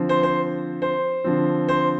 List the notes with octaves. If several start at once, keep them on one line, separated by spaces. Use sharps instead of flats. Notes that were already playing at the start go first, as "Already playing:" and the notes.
Already playing: D3 F3 C4
C5
C5
C5
D3 F3 C4
C5